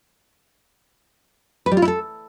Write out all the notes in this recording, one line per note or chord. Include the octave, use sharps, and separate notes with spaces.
B4
G3
F4
E4
A4